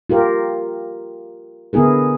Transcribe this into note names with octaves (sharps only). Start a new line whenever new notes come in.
F4 G4 A#4
D3 B3 E4 G#4 A#4